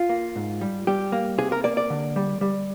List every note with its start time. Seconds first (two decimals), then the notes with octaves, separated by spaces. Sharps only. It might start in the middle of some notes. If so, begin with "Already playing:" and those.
Already playing: F4
0.09 A#3
0.36 G#2
0.61 G3
0.87 G3 G4
1.12 A#3
1.38 C3 G#4
1.52 A#4
1.64 A#3 D5
1.77 D5
1.90 D3
2.16 G3
2.41 G3